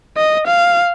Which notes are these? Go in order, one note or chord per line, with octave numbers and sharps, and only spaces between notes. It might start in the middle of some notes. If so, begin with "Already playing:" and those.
D#5
F5